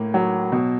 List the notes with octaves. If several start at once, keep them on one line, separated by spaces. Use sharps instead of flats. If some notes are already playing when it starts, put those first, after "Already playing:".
Already playing: A2 A#3
F#3
B2